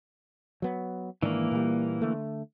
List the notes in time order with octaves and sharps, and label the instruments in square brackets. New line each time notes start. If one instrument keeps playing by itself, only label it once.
[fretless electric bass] F#3 B3
[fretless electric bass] G#2 D#3 D4 [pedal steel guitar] E3 A#3
[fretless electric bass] A#2 G3
D3 A3